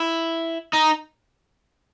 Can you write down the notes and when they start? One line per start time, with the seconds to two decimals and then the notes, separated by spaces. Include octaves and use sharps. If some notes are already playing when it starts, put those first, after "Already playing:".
Already playing: E4
0.73 D#4